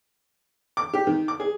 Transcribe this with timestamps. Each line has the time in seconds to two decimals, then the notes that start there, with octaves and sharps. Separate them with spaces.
0.77 D6
0.93 G4
1.07 D#3
1.28 D6
1.40 G#4